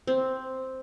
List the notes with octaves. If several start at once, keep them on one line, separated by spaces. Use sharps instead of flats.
C4